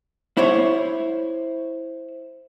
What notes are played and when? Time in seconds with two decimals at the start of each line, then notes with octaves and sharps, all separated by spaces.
0.37 E4 C5 C#5